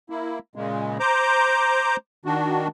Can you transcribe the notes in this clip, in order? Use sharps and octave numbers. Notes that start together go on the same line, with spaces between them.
A#3 E4
A#2 C#3 G#3
C5 A#5 D6 G6
D#3 D4 F#4